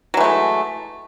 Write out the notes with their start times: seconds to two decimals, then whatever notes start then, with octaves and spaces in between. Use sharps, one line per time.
0.14 F#3
0.17 E3
0.21 A3
0.24 G#3